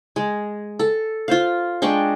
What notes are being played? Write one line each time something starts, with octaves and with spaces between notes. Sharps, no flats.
G#3
A4
F4 C5 F5
G#3 D4 G5 C#6